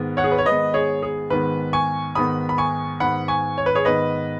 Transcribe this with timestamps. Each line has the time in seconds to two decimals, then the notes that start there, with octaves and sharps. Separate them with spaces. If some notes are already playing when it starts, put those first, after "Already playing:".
Already playing: G#2 D#3 G#3 B3
0.17 C#5 F#5
0.24 G#4
0.32 B4
0.38 C#5
0.45 G#2 D#3 G#3 B3 B4 D#5
0.74 G#4 C#5
1.03 G#4
1.30 G#2 D#3 G#3 B3 B4
1.73 G#5 C#6
2.15 G#2 D#3 B3 B5 D#6
2.49 B5
2.58 G#5 C#6
3.00 G#2 D#3 B3 F#5 B5
3.28 G#5 C#6
3.58 C#5
3.66 B4
3.75 G#4 C#5
3.85 G#2 D#3 B3 B4 D#5